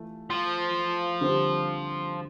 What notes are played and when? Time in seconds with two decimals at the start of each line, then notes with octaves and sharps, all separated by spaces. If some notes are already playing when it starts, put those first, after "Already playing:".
Already playing: E3 A3 F4
0.30 F3
1.21 D3 G3 C4